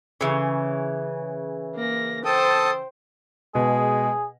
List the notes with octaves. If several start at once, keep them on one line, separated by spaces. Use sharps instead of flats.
C#3 E3
A#3 A#6
A4 C5 G5 A5 D#6
B2 G#3 G#4